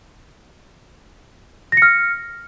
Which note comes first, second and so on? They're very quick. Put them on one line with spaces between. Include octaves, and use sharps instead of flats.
A#6 C#7 F6